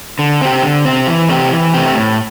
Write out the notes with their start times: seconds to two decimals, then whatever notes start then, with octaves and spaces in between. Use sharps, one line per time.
0.19 D3
0.41 C4 G4
0.63 D3
0.85 C4 G4
1.07 E3
1.29 A3 C4 G4
1.51 E3
1.74 A3 C4 G4
1.95 A2